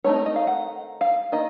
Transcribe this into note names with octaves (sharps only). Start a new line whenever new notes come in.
D#3 A3 C4 D#4 C#5
D#5
D#5
F5
F#5
F5
D#3 A#3 D#5